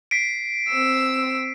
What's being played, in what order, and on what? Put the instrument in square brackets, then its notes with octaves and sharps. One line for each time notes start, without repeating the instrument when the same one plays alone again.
[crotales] B6 C7 D7
[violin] C4 E6